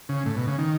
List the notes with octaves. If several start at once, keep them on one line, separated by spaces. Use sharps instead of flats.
C#3
A2
B2
C#3
D#3